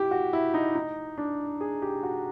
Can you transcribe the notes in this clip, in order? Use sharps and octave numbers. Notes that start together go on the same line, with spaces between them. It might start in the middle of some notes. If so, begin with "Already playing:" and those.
Already playing: E4 G4
F#4
E4
D#4
D#4
D4
G#4
G4
F#4